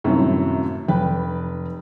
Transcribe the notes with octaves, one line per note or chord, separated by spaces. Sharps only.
G1 F#2 A2 C3 D#3
F1 B4 G5